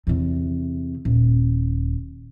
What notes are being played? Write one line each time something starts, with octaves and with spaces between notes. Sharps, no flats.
E2 C3
D#1